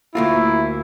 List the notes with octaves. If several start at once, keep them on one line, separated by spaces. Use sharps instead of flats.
D2 A#3 E4 F4